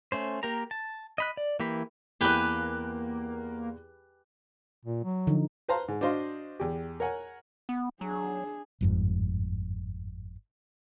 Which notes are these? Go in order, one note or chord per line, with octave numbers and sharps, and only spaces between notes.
A3 C#4 C5
A#3 G4 A#4 A#5
A5
D#5 B5 F#6
D5
E3 A#3 G4 B5
E2 A#3 G4 B4 G#5 F#6
A#2
F#3
D3 F3 D#4
B4 C5 F5 A5 A#5 C6
G#2
D4 F#4 C5 D#5 F5 C6
E2 G4
A#4 C#5 F#5 G#5
B3
F#3 D4 G#4
G1 F2 G#2